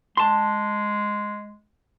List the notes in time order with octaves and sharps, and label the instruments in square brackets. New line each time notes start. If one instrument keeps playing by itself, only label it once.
[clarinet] G#3 [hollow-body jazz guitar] A5 C6